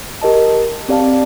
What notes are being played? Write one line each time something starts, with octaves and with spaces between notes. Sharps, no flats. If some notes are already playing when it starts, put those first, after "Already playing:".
G4 A#4 D#5 A5
C4 G4 D5 F5 A5